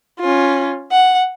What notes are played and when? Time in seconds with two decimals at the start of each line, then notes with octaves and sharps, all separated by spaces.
0.20 C#4 F4
0.92 F#5